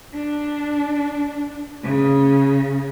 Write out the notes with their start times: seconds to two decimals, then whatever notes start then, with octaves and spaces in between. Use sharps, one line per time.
0.14 D4
1.83 C#3